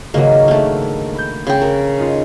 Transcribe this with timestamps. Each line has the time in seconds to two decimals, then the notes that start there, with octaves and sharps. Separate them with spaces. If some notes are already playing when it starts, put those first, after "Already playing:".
0.14 G#1 C#3 F#3 A#3 D#5
0.48 A3 A#3 D4 F6
1.15 B5 G6
1.47 C#3 G5
1.62 A#4
1.98 C#4 D#4 F4